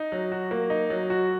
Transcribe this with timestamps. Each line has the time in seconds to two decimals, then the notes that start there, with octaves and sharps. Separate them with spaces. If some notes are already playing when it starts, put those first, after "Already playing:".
Already playing: D#4
0.12 F#3
0.32 F#4
0.51 A#3
0.70 D#4
0.90 F#3
1.10 F#4